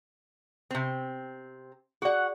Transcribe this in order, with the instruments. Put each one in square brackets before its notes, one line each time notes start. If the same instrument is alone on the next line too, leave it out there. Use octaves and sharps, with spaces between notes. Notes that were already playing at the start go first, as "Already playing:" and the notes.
[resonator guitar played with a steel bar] C3 C4
[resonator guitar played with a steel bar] F#4 F#5 [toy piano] G#4 D5